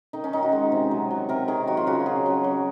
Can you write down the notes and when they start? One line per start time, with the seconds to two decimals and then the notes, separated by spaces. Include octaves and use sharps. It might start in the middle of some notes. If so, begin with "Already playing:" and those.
0.13 D#3 D#4
0.24 C#4
0.33 D#3 D#4
0.43 F#4
0.52 G#3
0.72 C3
0.91 F#3
1.11 F#3
1.29 C3 A#4
1.48 D#3 G#4
1.67 F#3 F#4
1.77 F4
1.87 C#3 F#4
2.06 F#3 G#4
2.26 F#3
2.44 F#3